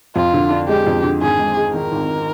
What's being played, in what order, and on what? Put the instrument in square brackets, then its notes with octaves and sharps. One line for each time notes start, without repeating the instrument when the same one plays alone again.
[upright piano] F2 [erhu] F4
[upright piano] D3
D4
[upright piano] G#3 [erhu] G4
[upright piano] F2
D3
[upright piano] G#1 [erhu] G#4
[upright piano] G#2
G#3
[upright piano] D#3 [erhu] A#4
[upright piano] G#1